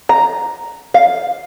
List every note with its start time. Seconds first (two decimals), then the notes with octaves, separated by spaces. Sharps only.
0.09 A#5
0.94 F5